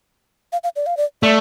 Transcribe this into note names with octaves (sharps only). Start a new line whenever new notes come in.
F5
F5
D5
F5
D5
A3 D5